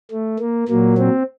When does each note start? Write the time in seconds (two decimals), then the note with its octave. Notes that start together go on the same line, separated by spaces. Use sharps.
0.11 A3
0.39 A#3
0.68 A#2 F#3 A#3
0.98 C4